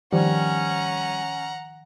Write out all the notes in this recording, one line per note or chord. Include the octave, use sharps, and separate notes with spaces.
D#3 F3 G3 C#4 C5 F#5 A#5